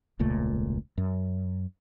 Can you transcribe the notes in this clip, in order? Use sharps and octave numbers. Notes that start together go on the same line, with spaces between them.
E1 C#2 A#2 A3
F#2